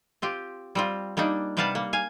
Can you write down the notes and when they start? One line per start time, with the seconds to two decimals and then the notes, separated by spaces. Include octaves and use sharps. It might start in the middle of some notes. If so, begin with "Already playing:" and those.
0.22 C4 F4 G4
0.75 G3 C4 F4
1.17 G3 A#3 D4 D#4
1.57 C3 G3 B4 F5 F#5 A5
1.75 A#3
1.93 F5 G#5